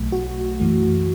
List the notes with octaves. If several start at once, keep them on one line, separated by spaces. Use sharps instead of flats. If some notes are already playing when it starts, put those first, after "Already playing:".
Already playing: B1 B2 F#3 A3
F#4
F#2 E3 A3